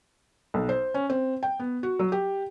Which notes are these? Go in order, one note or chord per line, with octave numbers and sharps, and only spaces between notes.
B1
C5
C#4
C4
G5
B3
F#4
F#3
G4